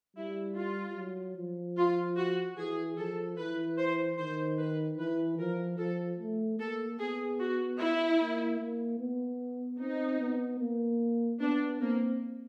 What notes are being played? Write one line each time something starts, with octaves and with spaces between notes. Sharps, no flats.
G3 E4
F4
F#3
F3
F4
F#4
E3 G#4
F3 A4
E3 B4
C5
D#3 C5
B4
E3 B4
F3 A#4
F3 A4
A3
A#3 A4
B3 G#4
F#4
E4
A#3
A#3
B3
C4 D#4
B3
A#3
B3 D4
A#3 C4